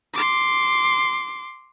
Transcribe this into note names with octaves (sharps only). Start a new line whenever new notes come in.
C6 D6